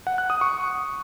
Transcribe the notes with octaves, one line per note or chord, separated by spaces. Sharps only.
F#5
F#6
D#6
C#6